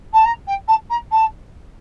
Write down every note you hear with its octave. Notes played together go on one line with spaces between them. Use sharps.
A5
A#5
G5
A5
A#5
A5